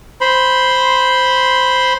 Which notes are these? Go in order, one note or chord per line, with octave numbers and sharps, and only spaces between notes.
C5 B5 C6